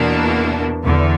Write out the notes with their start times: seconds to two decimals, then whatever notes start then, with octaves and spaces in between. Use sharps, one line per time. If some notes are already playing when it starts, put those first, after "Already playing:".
Already playing: E2 B2 A#3 D4
0.84 E2 D3